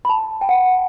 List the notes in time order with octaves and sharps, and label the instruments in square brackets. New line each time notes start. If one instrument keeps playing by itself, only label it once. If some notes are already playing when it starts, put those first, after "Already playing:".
[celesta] B5
A5
G5
F#5